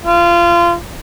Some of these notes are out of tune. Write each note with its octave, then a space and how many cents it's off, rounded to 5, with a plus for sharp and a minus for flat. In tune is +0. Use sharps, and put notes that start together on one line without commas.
F4 -25